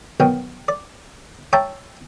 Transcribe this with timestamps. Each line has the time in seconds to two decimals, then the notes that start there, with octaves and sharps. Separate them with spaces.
0.20 B2 D#3 F#3 G5
0.68 D5
1.53 C#5 E5 G5 A5 A#5